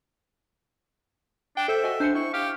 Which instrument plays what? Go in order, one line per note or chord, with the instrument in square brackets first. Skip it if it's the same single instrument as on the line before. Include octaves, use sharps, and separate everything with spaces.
[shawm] D4 [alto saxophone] G5
[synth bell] A4 C5 G6 [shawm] E5
[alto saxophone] F#4 [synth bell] D#5 G#5
[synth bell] D4 G#5 C#7 [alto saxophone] C5
[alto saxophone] E4 [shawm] C#6
[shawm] G4 [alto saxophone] F5